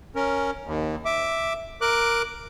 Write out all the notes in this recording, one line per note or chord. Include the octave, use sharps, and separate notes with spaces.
C#4 A#4
D#2
E5 D6
A#4 D6 F#6